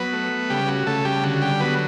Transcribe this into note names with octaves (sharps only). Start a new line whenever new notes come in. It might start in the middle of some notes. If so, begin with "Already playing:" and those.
Already playing: F#3 B3 B4
A3
C#3 G3 G4
F#4
C#3 A3 A4
G3 G4
D3 F#4
G3 G4
F#3 B3 B4